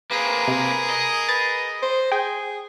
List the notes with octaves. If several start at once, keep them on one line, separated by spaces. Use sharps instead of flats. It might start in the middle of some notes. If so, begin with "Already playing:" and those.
A#3 C4 G#4 A#4 B4
C3
D#5
B4 A6
C5
G#4 G5